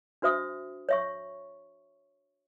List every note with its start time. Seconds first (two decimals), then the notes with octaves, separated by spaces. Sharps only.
0.22 D4 F#4 C5 E5 D#6
0.89 C#5 E5 C#6